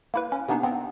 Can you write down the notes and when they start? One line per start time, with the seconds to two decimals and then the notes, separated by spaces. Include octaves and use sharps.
0.14 A#3 E4 B4
0.32 C#4
0.49 C3 A#3 B3 D4 D#4
0.63 B3 C4